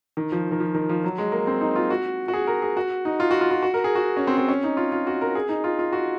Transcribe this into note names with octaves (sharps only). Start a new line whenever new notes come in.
D#3
F3
D#3
F3
D#3
F3
F#3
G#3
A#3
C4
D#4
F4
F#4
F#4
G#4
A#4
G#4
F#4
D#4
F4
F#4
F4
F4
F#4
A#4
G#4
F#4
C#4
C4
C4
C#4
D#4
F4
F4
F#4
A#4
G#4
D#4
F4
F4
F#4